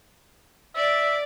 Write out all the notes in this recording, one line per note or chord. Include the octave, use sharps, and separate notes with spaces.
D5 E5